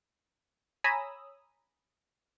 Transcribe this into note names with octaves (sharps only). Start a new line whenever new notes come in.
C#5 G#5 A#5 B5 D#6 E6